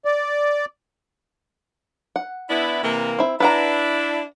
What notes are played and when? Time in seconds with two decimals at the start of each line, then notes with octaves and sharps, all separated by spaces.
0.05 D5
2.16 F#5
2.49 B3 D4 E4
2.83 C3 E3 A#3
3.19 C4 E4
3.40 D4 E4 B4 F#5 A#5